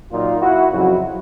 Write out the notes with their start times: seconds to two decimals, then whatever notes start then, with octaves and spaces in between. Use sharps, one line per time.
0.11 A#2 F#3 D#4 F4
0.41 E4 F#4
0.71 F2 C#3 F#3 E4 F#4